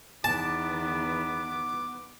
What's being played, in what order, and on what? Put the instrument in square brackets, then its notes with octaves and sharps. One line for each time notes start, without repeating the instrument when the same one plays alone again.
[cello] E2 D#3 [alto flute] B3 [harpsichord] A5 [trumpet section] D6